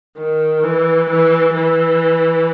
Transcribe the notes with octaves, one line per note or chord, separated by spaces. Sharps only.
D#3
E3
E3
E3